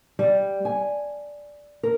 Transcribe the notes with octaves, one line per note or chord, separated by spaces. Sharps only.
G3
G#5
A#4